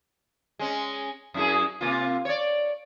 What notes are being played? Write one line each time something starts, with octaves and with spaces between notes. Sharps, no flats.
G#3 C#4
F#2 E4 G#4
C3 A#3 F4
C#5 D5